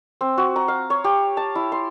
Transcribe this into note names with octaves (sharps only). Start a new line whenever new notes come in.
C4
F#4
A#5
F5
C#5
G4
A5
E4
C6